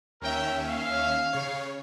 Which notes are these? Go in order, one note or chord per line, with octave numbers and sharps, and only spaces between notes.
D#2 C#4 A#4 E5 G5
F5
C#3 C#5